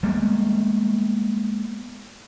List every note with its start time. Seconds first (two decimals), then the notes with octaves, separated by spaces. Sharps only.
0.03 G3 G#3 A#3 B3